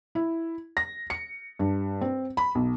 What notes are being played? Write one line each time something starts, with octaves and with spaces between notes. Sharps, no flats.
E4
A#6
C#7
G2
C4
B5
B1